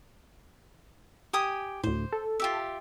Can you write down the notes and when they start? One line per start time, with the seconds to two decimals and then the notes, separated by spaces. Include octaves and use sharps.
1.33 G4 G#5 D#6
1.83 D2 A2 C5
2.13 A4
2.40 F4 G4 E5